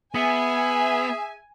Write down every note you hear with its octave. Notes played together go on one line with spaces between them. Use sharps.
B3 G#4 E5 G#5